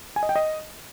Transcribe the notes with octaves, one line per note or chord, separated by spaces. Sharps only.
G#5
D#5
G5
D#5